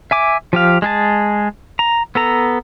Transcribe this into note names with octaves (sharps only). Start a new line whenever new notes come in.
E5 G#5 D6
F3 G4 F5
G#3 G#4 A5
A#5
B3 A4 A#5